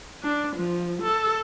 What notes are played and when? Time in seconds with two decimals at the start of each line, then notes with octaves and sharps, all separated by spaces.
0.23 D4
0.56 F3
1.02 A4